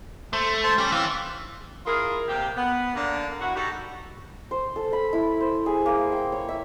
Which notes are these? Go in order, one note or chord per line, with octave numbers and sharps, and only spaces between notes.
A3 C5
C5 A5 C6
G3 C#4 G4 C#6
E3 C4 F5 E6
E4 F4 G#4 A#4
C3 A#3 G4
B3
D3 A#3 D4
E4 F#4
D#4 F#4 G4 A4
C5
A4
B5
E4
C5
G#4
A#3
G5
C#5
E5